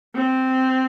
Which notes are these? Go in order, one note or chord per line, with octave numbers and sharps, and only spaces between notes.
C4